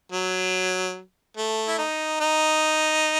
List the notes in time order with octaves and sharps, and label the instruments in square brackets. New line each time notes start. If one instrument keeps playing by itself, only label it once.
[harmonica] F#3
A3
E4
D#4
D#4